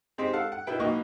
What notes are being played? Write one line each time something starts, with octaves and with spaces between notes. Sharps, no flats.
G#3 C4 D#4 G4 C5
A4 F5 F#5
F#5
B2 E4 B4 G5
B1 B2 A#3 D#4 D#5 C#6